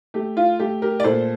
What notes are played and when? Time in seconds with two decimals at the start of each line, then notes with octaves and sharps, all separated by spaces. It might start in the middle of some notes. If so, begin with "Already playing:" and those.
0.14 A3 G4
0.37 F4
0.59 A3 G4
0.82 G4 A#4
1.00 D5
1.04 A#2 A4 C5